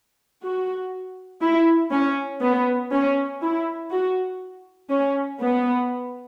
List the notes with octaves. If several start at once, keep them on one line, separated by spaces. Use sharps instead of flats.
F#4
E4
C#4
B3
C#4
E4
F#4
C#4
B3